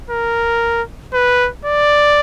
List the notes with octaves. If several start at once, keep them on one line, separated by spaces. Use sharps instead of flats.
A#4
B4
D5